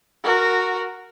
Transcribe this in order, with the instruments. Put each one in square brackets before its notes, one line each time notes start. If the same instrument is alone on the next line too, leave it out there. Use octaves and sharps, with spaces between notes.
[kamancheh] F#4 A#4